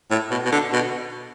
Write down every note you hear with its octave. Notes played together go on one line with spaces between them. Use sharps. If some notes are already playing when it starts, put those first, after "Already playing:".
A2
B2
B2
D3
B2